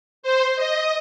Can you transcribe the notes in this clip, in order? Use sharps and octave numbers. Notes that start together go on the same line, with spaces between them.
C5
D#5